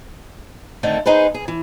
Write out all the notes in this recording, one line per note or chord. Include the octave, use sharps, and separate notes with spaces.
D3 D#3 A3 C4
D#4 G#4 B4 C5
G#4
E3